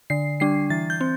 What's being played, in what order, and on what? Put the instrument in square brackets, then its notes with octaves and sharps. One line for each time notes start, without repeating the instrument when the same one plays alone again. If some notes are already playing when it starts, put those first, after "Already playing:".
[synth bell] D3 C7
G3 D4 C7
E3 A6
G6
C4